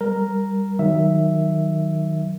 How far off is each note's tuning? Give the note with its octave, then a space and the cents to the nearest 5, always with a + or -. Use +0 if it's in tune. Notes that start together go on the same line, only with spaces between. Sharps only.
G3 +0 A#4 +0
D#3 +0 F#3 +0 E5 +0